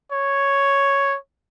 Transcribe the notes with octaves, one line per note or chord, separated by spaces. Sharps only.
C#5